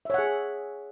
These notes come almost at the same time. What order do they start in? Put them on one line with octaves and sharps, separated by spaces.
E5 C#5 F#5 G#4